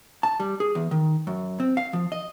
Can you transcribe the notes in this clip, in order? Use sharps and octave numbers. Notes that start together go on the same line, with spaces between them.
A5
G3
G#4
E2
D#3
F#2
C4
F5
F3
D#5